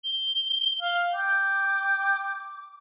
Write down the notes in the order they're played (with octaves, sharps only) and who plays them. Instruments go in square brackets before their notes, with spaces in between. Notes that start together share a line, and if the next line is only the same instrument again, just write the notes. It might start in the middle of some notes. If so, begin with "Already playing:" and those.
[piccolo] G7
[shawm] F5
[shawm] G5 [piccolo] D6